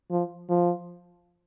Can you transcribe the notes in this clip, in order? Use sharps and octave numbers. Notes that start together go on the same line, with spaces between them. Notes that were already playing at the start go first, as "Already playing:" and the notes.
F3
F3